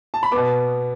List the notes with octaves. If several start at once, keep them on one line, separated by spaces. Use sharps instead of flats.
A5
B5
B2 B3 D6